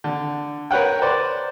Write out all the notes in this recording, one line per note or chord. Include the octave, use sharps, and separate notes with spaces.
D3
A#4 B4 C#5 F#5 G5
C5 D5